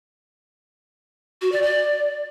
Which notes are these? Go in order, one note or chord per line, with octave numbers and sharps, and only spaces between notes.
F#4
D5
D5